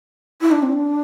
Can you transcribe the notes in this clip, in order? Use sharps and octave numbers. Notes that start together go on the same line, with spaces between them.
E4
D4
C4
D4